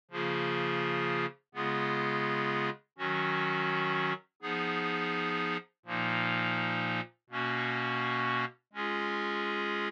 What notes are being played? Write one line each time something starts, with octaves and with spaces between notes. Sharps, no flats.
C#3 F3 A#3 F4 G#4
C#3 G#3 B3 F4 G#4
D#3 F#3 C#4 F#4
F3 B3 D#4 G#4
A#2 F3 A#3 D#4
B2 A#3 C#4 F#4
G#3 C#4 F4 G#4